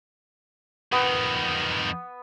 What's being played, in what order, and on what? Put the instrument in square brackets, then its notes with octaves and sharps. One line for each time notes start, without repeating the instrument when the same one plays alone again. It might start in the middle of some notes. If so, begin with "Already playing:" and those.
[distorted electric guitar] F2 D#3 [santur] B3